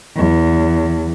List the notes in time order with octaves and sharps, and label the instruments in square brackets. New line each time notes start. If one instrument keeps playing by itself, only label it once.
[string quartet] E2